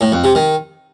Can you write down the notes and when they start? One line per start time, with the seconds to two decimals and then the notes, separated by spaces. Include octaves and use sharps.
0.01 A2
0.12 F2
0.24 C3
0.35 D#3